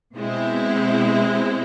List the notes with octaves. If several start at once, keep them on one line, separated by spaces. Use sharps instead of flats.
B2 G#3 C4 E4